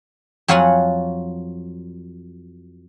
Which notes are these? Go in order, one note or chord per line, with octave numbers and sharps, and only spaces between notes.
F2 F#3 F4 C#5 F#5 G#5